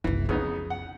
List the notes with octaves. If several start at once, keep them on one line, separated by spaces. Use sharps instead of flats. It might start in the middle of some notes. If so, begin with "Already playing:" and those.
F#1 C2 E3
F2 C#3 B3 D#4
F#5